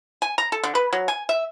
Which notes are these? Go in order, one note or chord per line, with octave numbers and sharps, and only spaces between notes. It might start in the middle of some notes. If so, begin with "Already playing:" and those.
G#5
A#5
A4
D3
B4
F#3
G#5
E5